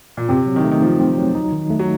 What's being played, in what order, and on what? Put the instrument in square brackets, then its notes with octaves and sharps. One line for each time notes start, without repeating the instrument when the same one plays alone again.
[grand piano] A#2
[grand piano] C3 [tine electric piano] C4
[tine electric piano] F#3
[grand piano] D#3
[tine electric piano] A3
[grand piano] D#3
[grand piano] F3 [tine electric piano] D#4
[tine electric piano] C4
F#3
D#4
D#3
A3
[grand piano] F#3